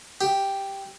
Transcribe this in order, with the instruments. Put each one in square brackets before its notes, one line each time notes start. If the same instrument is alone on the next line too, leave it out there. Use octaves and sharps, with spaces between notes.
[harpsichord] G4